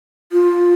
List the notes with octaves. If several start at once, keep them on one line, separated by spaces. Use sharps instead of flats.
F4